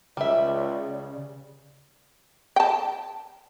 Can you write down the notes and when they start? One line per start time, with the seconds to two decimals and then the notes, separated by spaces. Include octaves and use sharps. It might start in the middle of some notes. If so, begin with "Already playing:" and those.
0.17 C#2 C#3 G3 D5 E5
2.56 G5 A5